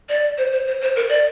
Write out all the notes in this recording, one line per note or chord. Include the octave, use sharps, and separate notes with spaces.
D5
C5
C5
C5
C5
A#4
D5